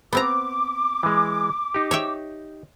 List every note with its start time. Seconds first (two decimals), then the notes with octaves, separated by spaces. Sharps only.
0.13 B3 C4 A#5 D6
1.03 E3 G#3
1.74 D#4 G4
1.91 C#5 E5 G5